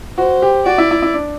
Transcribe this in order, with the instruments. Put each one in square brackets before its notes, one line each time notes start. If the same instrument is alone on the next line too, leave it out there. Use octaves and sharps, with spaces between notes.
[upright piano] F#4 [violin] C5
[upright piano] G4
[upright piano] F#4 [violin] D5
[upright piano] E4
E4
E4
D4